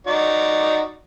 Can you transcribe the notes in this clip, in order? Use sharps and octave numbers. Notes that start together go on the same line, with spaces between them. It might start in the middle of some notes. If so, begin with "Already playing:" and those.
D#4 F#4 D5